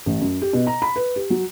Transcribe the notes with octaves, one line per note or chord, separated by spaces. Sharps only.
A1
F#2
G4
B2
A#5
B5
B4
G4
F#3